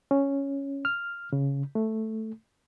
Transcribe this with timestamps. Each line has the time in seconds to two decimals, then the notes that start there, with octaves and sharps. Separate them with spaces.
0.11 C#4
0.85 F6
1.33 C#3
1.75 A3